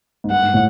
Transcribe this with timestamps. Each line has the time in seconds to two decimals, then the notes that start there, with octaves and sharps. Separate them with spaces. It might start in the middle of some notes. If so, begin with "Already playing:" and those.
0.24 G#2
0.30 G2 F#5
0.42 G#2
0.54 A2